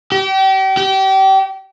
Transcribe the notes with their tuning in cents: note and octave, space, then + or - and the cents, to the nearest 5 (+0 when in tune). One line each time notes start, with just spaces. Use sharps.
G4 -35
G4 -30